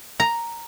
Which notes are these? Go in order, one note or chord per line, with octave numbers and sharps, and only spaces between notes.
A#5